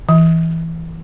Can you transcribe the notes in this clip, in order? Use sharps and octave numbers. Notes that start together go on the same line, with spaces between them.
E3